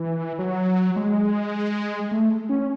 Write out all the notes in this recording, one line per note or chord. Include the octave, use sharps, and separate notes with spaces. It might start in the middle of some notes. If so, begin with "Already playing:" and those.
Already playing: E3
F#3
G#3
A3
C#4